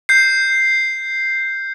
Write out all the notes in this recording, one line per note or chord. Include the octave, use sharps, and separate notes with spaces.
G6 C7